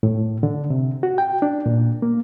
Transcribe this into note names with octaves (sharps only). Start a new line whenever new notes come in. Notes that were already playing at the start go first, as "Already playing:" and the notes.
A2
D3
C3
F#4
G5
D4
A#2
A#3